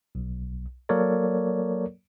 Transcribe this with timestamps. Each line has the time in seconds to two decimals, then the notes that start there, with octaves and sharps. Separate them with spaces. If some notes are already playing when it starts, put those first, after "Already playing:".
0.15 B1
0.89 F#3 A#3 A4 A#4 C#5 D5